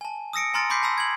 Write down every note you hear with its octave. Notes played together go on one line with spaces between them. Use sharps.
G#5 A5
D#6 E6 A#6 C#7 D7
G#5 A#5 C6 F6 A6 D7
B5 C6 D6 G6 B6 C7
A5 B5 E6
G#6 F#7